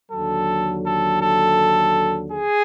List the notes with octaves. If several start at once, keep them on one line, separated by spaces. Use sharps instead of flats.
D#2 D3 F#3 A4
A4
A4
G#4